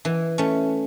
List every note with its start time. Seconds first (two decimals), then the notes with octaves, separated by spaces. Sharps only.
0.05 E3
0.38 A3 C#4